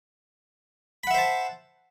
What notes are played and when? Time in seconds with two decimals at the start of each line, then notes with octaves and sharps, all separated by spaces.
1.04 B5
1.07 F#5
1.11 E5
1.14 C5
1.18 A5